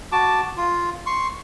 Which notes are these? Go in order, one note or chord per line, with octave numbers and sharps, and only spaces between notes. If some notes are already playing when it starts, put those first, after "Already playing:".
F#4 A5 D6
F4
C6 C#6